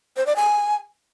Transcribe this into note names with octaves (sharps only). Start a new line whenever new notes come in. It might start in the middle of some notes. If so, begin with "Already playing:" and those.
C5
D5
G#5